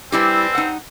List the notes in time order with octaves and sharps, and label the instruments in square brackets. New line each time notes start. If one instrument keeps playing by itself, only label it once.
[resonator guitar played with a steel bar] G3 E4 G4 [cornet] C4 [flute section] B4 G#5 E6
[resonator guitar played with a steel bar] D#4 F#5